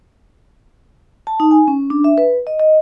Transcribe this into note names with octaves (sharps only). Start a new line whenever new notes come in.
A5
D#4
G#5
C#4
D4
E5
B4
D#5
D#5